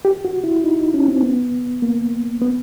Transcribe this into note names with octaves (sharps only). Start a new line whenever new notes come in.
G4
F#4
E4
D#4
C#4
C4
B3
A#3
B3